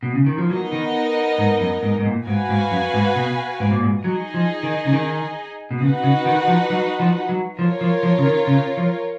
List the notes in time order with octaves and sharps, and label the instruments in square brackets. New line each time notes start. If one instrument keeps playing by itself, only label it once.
[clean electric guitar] B2
C#3
D#3
F3
[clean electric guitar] F#3 [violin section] B3 D#4 A#4 D#5
[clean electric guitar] D#3
G#2
F#2
G#2
G#2
A#2
[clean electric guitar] G#2 [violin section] F#4 B4 F5 G#5
[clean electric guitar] G#2
F#2
G#2
B2
G#2
A#2
G#2
[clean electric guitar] F#3 [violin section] D#4 G#4 D#5 G#5
[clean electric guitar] F3
D#3
C#3
D#3
B2
[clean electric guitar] C#3 [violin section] D#4 F#4 B4 F#5
[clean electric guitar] C#3
D#3
F3
F#3
F3
F#3
[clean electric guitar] F3 [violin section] F4 A#4 C#5
[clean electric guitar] F3
F3
C#3
D#3
C#3
F3